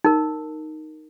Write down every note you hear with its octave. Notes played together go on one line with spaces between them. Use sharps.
D#4 A#4